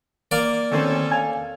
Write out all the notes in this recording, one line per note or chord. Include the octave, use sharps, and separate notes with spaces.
A#3 D5
D2 D#3 C4 C#4 A4
F5 G#5